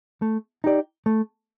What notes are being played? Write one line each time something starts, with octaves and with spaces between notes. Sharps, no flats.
A3
D#4 G4 D5
A3